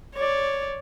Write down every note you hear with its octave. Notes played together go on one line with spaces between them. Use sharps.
C#5 D5